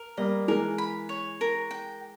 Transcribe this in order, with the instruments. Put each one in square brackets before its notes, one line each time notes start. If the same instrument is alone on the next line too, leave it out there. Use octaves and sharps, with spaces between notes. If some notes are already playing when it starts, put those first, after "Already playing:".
Already playing: [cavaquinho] A#4
[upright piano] G3 A#3 [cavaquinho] D#5
[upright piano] E3 G#3 [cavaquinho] A#4
[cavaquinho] B5
C#5
A#4
G5